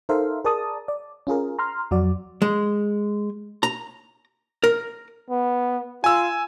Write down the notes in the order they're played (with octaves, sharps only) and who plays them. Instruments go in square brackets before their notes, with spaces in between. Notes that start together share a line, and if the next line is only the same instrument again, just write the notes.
[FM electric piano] D#4 A4 A#4 C5 E5 F5
G#4 A#4 D5 A5 D#6
D5
C#4 F4 G#4 A#4
A#5 C6 F6
F2 F#3 F#4 D5
[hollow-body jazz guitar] G#3
A#5
A#4
[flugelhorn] B3
[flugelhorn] F4 [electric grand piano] G#5 E6